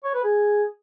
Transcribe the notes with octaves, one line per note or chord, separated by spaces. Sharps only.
C#5
B4
G#4